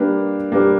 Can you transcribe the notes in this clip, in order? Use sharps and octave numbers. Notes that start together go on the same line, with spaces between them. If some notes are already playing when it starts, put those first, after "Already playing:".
Already playing: G3 A#3 D4 G4 B4
G3 A#3 D4 G4 B4